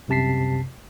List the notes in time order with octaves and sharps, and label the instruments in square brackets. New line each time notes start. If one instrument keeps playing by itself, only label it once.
[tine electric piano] C2 F#2 C3 A5 B6 C7